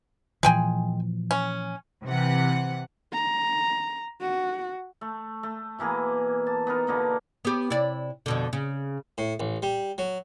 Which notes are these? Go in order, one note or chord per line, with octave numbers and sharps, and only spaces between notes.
A#2 E3 F3 G#3 G5 G#5
C#4
C3 E3 F#5
A#5
F#4
A3
A3
B2 E3 A#3 G#4
A5
B3 D#4 A#4
B2 D3 A#3 B3
B3 G4
C3 E4 D5
F2 B2 D3
C#3
A2
A1
G3
F#3